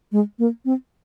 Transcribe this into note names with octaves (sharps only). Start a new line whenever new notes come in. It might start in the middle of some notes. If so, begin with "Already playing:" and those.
G#3
A#3
C4